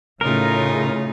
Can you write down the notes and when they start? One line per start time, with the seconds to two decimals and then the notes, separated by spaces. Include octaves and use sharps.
0.21 A2 C#3 A3 D#4 F4 A#4